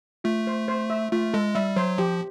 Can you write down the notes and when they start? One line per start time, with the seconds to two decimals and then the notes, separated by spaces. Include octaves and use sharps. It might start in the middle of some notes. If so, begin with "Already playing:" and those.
0.24 A3 F4
0.47 C5
0.68 C5
0.90 E5
1.12 A3 F4
1.33 G#3 A4
1.55 G3 E5
1.76 F#3 C5
1.98 F3 G4